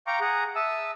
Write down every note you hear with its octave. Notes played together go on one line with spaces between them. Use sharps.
F5 G5 A#5 C#6 D6
G#4 F#5 A#5
E5 A5 D#6 E6